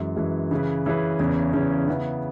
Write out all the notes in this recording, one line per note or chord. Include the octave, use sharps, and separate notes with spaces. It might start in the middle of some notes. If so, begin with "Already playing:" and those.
Already playing: F#2 E3 G#3
F#2 E3 G#3
C#3 E3 C#4 G#4 B4
C#3 E3 C#4 G#4 B4
E2 C#3 E3 C#4
E2 C#3 E3 C#4
C#3 E3 B3